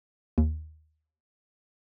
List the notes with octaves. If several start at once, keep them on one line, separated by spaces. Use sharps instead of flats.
D#2